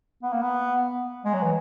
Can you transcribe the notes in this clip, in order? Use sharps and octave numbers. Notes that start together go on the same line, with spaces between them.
B3
A#3
B3
G#3
F#3
E3